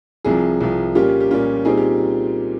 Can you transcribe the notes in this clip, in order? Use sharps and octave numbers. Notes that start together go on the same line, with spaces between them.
C2 C3 F3 G#4
C2 C3 F3
A#2 G3 A#3 C#4 F4 G4
G4
A#2 G3 A#3 C#4 F4
A#2 G3 C4 D#4 G#4
G4